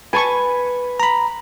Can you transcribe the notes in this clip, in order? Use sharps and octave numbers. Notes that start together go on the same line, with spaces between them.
B4 G#5 A5 C#6
A#5 B5